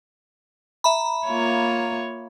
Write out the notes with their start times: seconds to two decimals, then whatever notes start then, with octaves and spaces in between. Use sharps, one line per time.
0.84 E5 A#5 B5
1.27 A#3 F4 C#5